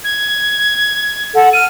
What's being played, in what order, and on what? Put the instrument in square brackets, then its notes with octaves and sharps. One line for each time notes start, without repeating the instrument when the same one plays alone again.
[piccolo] G#6
[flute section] A4 F#5
[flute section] F6 [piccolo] D#7